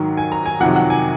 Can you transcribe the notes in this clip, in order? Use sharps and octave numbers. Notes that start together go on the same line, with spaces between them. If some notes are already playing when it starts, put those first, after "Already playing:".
Already playing: G#2 D#3 F#3
G#5
A#5
G#5
F2 C3 D#3 F#3 F#5
F#5
G#5